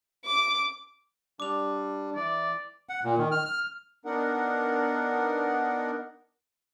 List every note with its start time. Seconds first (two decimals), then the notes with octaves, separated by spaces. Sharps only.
0.25 D6
1.40 G3 D4 D6 F7
2.16 E3 D5
2.89 F#5
3.04 A#2
3.18 D#3
3.32 F6
3.46 F6
4.05 B3 D4 D#4 A#4 F#5